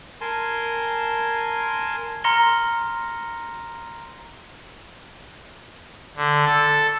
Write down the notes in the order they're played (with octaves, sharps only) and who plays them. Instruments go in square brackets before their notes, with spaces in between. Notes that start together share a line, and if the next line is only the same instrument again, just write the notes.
[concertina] A#4 G#5 A5 C6
[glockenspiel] A#5 C6 F6 A#6 C#7 G7
[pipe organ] D3
A4